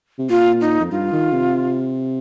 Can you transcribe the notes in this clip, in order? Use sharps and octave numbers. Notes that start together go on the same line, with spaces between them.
C3
A#2 F4
D#4
F2
G2 F4
D#3
C3